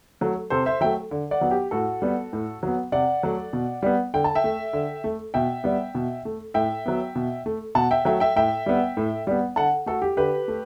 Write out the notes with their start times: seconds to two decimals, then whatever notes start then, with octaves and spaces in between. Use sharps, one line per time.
0.21 F#3 A3
0.50 C3 A4 C5
0.66 C5 E5
0.81 F#3 A3 E5 G5
1.11 D3
1.31 D5 F#5
1.41 F#3 B3
1.51 G4
1.71 A2 F#4 A4
2.02 G3 B3
2.33 A2
2.63 F#3 B3
2.92 C3 D5 F#5
3.23 F#3 A3
3.53 B2
3.83 G3 B3
4.14 D3 G5
4.24 A5
4.35 E5 G5
4.44 A3
4.73 D3
5.04 A3
5.34 B2 E5 G5
5.64 G3 B3
5.95 B2
6.25 A3
6.54 A2 E5 G5
6.86 F#3 B3
7.15 B2
7.46 A3
7.75 B2 F#5 A5
7.91 E5 G5
8.05 F#3 A3 E5 G5
8.20 E5 G5
8.36 A2 E5 G5
8.66 G3 B3
8.97 A2
9.27 G3 B3
9.56 D3 F#5 A5
9.86 A3 F#4 A4
10.02 G4
10.17 D3 G4 B4
10.48 A3